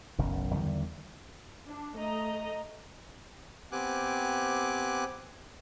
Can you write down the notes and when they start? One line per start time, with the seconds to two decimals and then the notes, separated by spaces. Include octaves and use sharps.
0.18 F#1 B1 F#2 D#3
0.55 E2 D3 D#3 G3
1.68 D4
1.97 A3 D#5 A#5
3.72 B3 C4 G4 G#5 D6 F#6